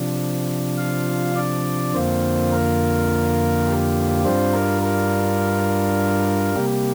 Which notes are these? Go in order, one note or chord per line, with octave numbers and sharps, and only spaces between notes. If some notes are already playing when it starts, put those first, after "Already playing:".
Already playing: C3 F3 D4
F4 F5
D4 D5
F2 D3 A#3 C4 F4 C5
A#4
G4
G2 G3 C4 D4 F4 C5
A#4
A#4
C3 G3 A#3 G4